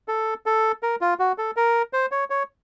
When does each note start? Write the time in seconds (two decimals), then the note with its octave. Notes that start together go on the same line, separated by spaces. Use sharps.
0.08 A4
0.46 A4
0.83 A#4
1.01 F4
1.19 F#4
1.38 A4
1.57 A#4
1.93 C5
2.11 C#5
2.30 C#5